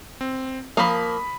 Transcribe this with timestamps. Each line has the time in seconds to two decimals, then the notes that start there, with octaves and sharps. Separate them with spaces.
0.21 C4
0.77 F3 A#3 B5 D#6